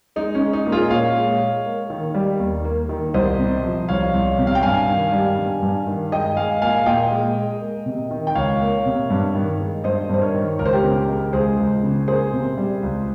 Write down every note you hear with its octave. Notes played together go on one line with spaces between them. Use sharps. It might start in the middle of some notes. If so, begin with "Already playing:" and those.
G#3 D#4
C#4
G#3
D#4
A#2
F4 G#4
A#2 C#5 F5
G#3
G#3
A#3
D#3
G3
D#2
A#3
D#3
C2 C5 D#5
C3
F3
C2 C#5 F5
C2
C3
F5
G5
G2 F5 G#5
D#3
G3
G2
G2
D#3
G#3 D#5 G5
G#3 F5 G#5
A#2 F5 G#5
A#2 D#5 G5
G#3
G#3
A#3
C3
D#3
G5
C#2 C#5 F5
A#3
C3
G2
D#3
G#3
G2 C5 D#5
G2 C5
A#4 C#5
D#3
C#2 A#4
C5
G4 A#4
C#3
G#3
C#2 G#4 C5
C#2
C#3
A#3 G#4 C5
C3
G3
C#2